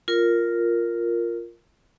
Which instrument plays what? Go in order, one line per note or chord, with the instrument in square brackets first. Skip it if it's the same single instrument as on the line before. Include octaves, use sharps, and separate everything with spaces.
[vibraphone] F4 A#4